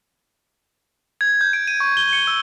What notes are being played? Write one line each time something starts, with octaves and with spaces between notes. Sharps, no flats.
G#6
G6
D7
D#7
C#6
G7
C#7
E6